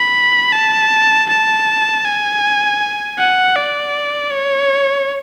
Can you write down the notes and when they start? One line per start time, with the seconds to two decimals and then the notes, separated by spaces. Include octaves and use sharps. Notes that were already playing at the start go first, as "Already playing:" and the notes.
Already playing: B5
0.53 A5
1.29 A5
2.05 G#5
3.19 F#5
3.56 D5
4.32 C#5